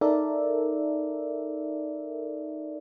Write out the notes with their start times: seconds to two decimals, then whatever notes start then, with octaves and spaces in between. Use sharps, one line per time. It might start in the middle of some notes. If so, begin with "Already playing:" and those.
0.01 D#4 A4 A#4 D5 E5